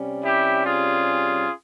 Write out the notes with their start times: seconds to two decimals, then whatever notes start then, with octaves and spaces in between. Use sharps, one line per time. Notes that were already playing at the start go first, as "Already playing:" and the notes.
Already playing: C3 G3 C#4
0.24 E4 G4
0.65 F4 G#4